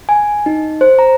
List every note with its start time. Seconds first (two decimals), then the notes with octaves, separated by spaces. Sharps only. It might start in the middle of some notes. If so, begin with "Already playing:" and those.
0.09 G#5
0.46 D#4
0.81 C5
0.99 A#5